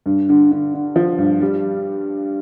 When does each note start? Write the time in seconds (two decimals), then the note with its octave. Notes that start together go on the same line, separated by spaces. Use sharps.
0.06 G2
0.29 D3
0.52 D3
0.74 D3
0.96 F3
1.19 G2
1.41 G3